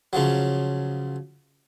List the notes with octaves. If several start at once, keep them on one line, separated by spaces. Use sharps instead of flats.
C#3 F3 F#3